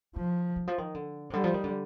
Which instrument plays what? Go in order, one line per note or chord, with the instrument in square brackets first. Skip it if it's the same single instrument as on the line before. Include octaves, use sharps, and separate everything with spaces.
[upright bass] D#3 [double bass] F3
[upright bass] D#3
F3
D#3
D3
C3
[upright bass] D3 [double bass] G3
[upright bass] F3
D#3
D3